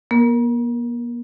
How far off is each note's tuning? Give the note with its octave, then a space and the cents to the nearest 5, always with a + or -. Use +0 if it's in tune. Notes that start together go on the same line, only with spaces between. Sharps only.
A#3 +45 A#4 +0